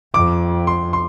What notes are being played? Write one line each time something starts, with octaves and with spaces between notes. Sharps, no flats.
F2 D6
C6
C6